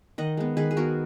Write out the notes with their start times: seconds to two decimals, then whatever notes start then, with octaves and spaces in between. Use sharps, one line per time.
0.18 D#3 D#5 F#5
0.37 G#3 B3
0.57 D#3 G#4 B4
0.71 G#4
0.77 G#3 B3 F#4 A#4